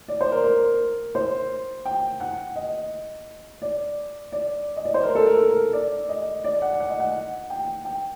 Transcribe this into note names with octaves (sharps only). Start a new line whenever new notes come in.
D5
C5
A#4
A#4
C5
G5
F#5
D#5
D5
D5
D#5
D5
C5
A#4
A4
A#4
A#4
D5
D#5
D5
F#5
F#5
D#5
F#5
G5
G5